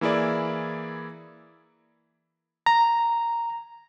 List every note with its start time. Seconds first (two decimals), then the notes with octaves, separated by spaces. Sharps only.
0.01 E3 A#3 E4 G#4 D5
2.66 A#5